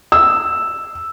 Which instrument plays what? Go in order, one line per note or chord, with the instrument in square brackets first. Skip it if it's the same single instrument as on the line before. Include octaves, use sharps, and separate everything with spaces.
[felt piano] E6